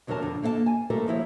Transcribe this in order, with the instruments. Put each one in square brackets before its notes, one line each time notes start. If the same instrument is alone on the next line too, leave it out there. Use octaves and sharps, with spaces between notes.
[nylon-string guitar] E2 D3 F#3 D4 A#4 A5
F2 D3
D3 A#3 A4 E5 A5
G#5
G3 A3 A#3 A4 A#4
D#3 F3 E4 C#5